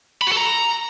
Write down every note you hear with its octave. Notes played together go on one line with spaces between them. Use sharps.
B5
F#4
A4
A#5